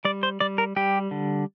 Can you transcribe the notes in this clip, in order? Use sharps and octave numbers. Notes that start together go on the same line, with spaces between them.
G3 D5
C5
G3 D5
A#4
G3 G4
D3